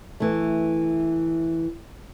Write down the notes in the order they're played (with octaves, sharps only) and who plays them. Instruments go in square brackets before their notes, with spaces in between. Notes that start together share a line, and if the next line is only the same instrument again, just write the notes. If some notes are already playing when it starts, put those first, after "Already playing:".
[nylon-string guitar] E3 A3